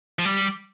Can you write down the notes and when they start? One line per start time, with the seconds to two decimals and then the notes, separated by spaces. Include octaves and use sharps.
0.19 F3
0.25 G3